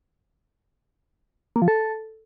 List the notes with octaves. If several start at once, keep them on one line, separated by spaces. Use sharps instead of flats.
A#3
F3
A4